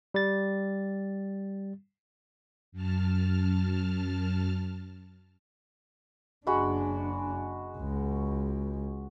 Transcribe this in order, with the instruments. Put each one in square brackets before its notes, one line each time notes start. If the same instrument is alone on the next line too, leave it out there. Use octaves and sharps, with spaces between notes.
[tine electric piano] G3 A6
[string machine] F#2 A5 F6
[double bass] F#1 D4 [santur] G#3 F#4 B5
[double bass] C#2